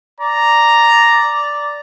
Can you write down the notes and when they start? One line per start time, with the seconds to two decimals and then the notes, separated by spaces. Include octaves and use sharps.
0.20 D5 A#5